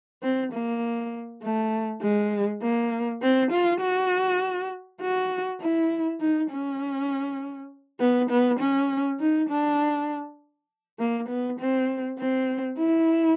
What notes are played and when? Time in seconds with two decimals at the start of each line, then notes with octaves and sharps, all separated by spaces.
0.22 C4
0.52 A#3
1.43 A3
2.02 G#3
2.62 A#3
3.22 C4
3.51 F4
3.81 F#4
5.01 F#4
5.61 E4
6.20 D#4
6.51 C#4
8.00 B3
8.30 B3
8.60 C#4
9.20 D#4
9.50 D4
10.99 A#3
11.29 B3
11.60 C4
12.19 C4
12.79 E4